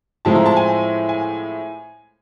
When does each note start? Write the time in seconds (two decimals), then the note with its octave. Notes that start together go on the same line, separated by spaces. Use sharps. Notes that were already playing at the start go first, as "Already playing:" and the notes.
0.25 A2 F3 G#3 C4 E4 A5
0.35 A#5
0.46 A5
0.56 G#5
1.09 G#5